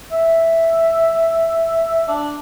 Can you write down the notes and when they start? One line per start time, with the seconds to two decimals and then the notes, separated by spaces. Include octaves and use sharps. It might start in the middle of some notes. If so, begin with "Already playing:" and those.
0.12 E5
2.08 D4